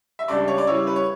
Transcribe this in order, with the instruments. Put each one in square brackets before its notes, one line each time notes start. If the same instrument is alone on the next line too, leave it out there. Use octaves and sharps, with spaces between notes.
[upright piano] E5
C#2 C#3 G3 D4 D5
C#5
D5
C#3 G3 C#4 E4 C#5
B4
C#5